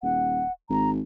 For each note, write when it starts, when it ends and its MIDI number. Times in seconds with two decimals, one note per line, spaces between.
0.03 0.44 27
0.03 0.52 78
0.70 1.01 32
0.70 0.90 82